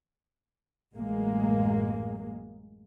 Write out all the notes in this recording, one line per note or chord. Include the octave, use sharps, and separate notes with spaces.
A1 F#2 G#3 A#3